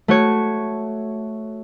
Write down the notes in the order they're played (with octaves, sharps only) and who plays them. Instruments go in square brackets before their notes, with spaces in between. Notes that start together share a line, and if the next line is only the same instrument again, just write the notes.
[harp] A3 F#4 C#5